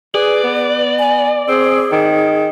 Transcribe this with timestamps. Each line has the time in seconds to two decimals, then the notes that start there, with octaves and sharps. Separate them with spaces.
0.15 G#4 B4 D5
0.44 B3
0.99 G#5
1.48 C4 G#4
1.92 D#3